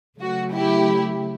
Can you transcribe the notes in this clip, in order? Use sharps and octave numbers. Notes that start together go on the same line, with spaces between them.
C#3 F#3 A3 F#4
E4 G4